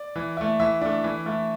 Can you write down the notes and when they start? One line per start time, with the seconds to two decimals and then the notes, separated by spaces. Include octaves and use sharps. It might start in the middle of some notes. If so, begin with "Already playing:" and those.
Already playing: D5
0.16 E3
0.37 A3 E4
0.60 E3 E5
0.81 A3 D4
1.04 E3
1.26 A3 E4